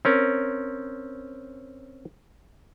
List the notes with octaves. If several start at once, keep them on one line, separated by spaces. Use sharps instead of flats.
C4 C#4 A#4